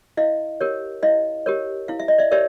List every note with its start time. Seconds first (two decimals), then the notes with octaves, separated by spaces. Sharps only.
0.17 E4 D#5 F5
0.61 G4 A#4 C#5
1.02 E4 D#5 F5
1.46 G4 A#4 C#5
1.88 E4 F5
1.99 E5
2.08 D#5
2.18 D5 E5
2.31 G4 A#4 C#5 D5 E5